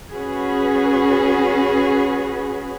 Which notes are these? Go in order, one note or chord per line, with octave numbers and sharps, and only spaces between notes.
C#4 F#4 G#4 B4